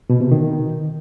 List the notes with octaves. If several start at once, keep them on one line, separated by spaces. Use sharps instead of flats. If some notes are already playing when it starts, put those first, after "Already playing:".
B2
C3
D#3